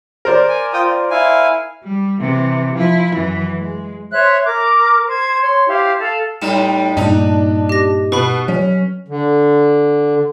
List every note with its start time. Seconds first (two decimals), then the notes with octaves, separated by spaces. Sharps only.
0.25 A#4 C5 D5
0.49 G#5
0.73 F4 G5 D#6
0.85 F4
1.11 E4 F5 G#5
1.84 G3
2.20 C3 E3
2.75 F3 E4
3.12 F#2 E3
3.57 G#3
4.11 C5 C#5 E5 F#6
4.44 A#4 D6
5.08 C5 G#6
5.41 C#5 C6
5.66 E4 G4 C5 F5
6.00 A4 F5
6.42 A2 G3 D#4 E7
6.97 G2 A#2 D4 D#4
7.69 G4 A#6
8.12 B2 B4 B5
8.48 F#3 C#4
9.08 D3